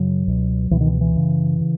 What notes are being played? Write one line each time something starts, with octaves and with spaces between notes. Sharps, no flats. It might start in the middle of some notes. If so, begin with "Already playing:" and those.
Already playing: F#2 C#3 F#3
C#2 B2
C#2 B2 E3
D#3
E3
E3
F#2 C#3
C#3